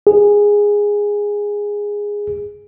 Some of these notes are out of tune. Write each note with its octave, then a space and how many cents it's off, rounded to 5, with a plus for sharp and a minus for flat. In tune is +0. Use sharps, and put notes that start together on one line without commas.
G#4 -10